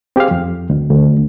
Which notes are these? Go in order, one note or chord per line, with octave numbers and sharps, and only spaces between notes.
C4 G4 G#4 C5 F5
F2
D2
D2